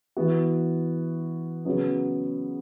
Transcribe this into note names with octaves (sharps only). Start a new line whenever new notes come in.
E3 B3 F#4
C#3 F#3 B3